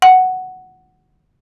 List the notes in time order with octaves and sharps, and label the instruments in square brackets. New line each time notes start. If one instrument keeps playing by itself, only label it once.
[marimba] F#5